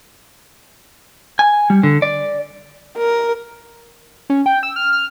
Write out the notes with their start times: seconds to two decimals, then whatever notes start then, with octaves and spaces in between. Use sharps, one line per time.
1.39 G#5
1.70 G3
1.83 D3
2.02 D5
2.98 A#4
4.30 C#4
4.46 G5
4.63 E6
4.76 F6
4.93 F6